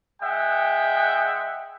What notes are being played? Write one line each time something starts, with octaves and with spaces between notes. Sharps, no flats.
G#3 E5 F#5 G5